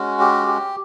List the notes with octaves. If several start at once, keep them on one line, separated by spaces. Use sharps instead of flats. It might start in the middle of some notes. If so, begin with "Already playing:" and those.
Already playing: G#3 C#4 F#4
G4
G4